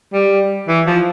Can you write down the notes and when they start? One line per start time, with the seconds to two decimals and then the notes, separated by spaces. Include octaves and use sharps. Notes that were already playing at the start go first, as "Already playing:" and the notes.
0.13 G3
0.68 E3
0.86 F3